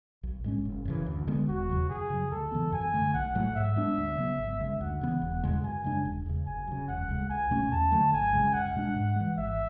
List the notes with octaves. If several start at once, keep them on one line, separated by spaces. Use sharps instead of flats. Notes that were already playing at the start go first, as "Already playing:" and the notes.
B1
A2 G#3 C#4
F#1
F#2 C#3 E3
D2
D3 G#3 B3
E1 F#4
E2 C#3 F#3
F#2 G#4
C#3 F#3
D2 A4
C#3 E3 B3
F#2 G#5
D3 A3
B1 F#5
A2 F#3 A3
G#2 E5
G#3 B3 D4
D2
C#3 F#3 B3
G#1
F#2 C#3 G#3
D2 F#5
C#3 E3 B3
E1
E2 C#3 G#3
F#2 G#5
C#3 G#3 D4
E1
E2 C#3
F#1 G#5
F#2 C#3
E1 F#5
D2 C#3 G#3
C#2 G#5
B2 A3 C#4
E2 A5
D3 F#3 A3
G#1 G#5
F#2 C#3 G#3
C#2 F#5
B2 G#3 D4
G#2
E3 G#3
G#1 E5